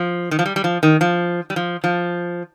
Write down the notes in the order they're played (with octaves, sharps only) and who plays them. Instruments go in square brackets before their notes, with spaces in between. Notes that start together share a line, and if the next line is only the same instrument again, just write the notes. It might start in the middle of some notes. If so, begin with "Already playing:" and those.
Already playing: [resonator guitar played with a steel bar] F3
D#3
F3
G3
G3
F3
D#3
F3
G3
F3
F3